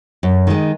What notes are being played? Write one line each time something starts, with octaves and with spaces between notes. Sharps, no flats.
F#2
D#3 G#3